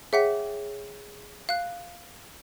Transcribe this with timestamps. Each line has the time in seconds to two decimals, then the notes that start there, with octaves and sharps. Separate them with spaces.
0.13 G#4 C#5 E5 F#5 G5 B6
1.49 F5 F#6